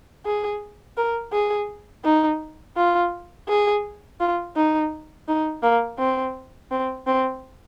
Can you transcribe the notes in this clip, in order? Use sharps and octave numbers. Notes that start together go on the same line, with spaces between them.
G#4
A#4
G#4
D#4
F4
G#4
F4
D#4
D#4
A#3
C4
C4
C4